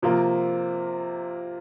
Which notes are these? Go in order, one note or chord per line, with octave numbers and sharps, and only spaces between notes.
C3 F3 A#3 F4